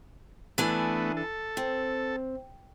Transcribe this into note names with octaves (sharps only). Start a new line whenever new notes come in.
E3 A3 B3 D4 G#5
A4
C4